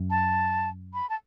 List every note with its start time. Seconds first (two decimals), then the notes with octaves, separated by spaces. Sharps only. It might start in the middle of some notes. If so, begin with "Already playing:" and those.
Already playing: F#2
0.10 A5
0.94 B5
1.10 A5